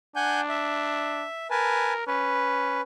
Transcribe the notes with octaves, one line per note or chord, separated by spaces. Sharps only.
D4 F#5 G#5 G6
E5
A#4 B4 G#5 A5
C#4 B4